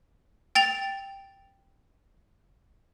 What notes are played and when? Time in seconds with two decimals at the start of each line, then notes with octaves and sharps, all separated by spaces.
0.55 G5 A6 F7